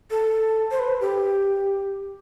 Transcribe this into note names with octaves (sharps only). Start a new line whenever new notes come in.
A4
C5
B4
G4